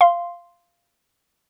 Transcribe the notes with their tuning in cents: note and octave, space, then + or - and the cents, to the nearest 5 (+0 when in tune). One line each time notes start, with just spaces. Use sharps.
F5 -10 C6 +0